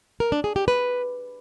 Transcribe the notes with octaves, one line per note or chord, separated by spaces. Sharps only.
A#4
D4
G#4
G4
B4